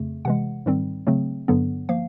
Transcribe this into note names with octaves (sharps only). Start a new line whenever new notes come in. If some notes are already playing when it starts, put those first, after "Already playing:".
Already playing: F2 C#3 A3
C3 E3 G#3 F#5
G#2 D#3 G3 C4
C#3 F#3 A3 C4
G2 D3 F#3 B3
F3 A#3 F5